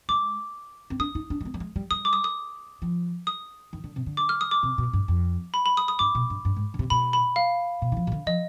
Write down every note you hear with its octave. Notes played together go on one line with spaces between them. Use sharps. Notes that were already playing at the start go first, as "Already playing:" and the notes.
G#3 D6
C4
D4 D#6
D#4
D4
G#3
B3
G3
G#3
G3
G3 D#6
D6
D#6
D#6
F3
D#6
D#3
D3
C3
D3
D6
F6
D#6
D6
C3
B2
G2
F2
B5
B5
D#6
D#6
G2 D6
B2
G2
G2
G#2
D3
C3
B2 B5
B5
F5
B2
D#3
F3
C3
D3
F3 D#5